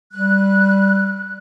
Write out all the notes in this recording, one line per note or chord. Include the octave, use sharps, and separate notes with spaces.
G3 F#6